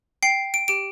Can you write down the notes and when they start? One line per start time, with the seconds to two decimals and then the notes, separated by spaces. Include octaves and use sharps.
0.23 G5 C7
0.54 D7
0.68 G4 D7